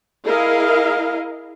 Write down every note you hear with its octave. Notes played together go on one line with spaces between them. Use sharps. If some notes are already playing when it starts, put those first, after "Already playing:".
E4 G#4 A#4 D#5 F5